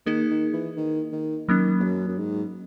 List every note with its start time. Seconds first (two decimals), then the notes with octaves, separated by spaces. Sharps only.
0.06 D#3 A#3 D#4 G#4
0.30 D#3
0.53 E3
0.77 D#3
1.12 D#3
1.48 D#3 F#3 A#3 C#4
1.79 E2
1.84 F#2
2.08 F#2
2.18 G#2